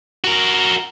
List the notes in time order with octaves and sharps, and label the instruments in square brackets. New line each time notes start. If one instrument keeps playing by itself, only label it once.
[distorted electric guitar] F#4 A#4